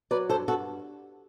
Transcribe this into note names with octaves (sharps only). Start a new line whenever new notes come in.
F#3 B4 D5
G2 A4 C5
G2 F#4 A4